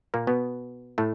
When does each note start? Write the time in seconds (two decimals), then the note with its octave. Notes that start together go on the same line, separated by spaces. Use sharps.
0.14 A#2 A#3
0.27 B2 B3
0.98 A2 A3